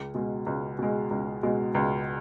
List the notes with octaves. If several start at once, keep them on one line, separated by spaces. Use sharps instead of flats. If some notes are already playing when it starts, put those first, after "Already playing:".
Already playing: C#2
B2 G#3
C#2
B2 G#3
C#2
B2 G#3
C#2